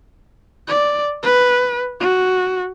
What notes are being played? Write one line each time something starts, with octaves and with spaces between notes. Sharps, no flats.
D5
B4
F#4